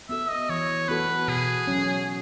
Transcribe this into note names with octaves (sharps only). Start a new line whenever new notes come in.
B3 F#4 A4 E5
D#5
E3 C#5
B3 F#4 A4 B4
B2 G#4
F#3 C#4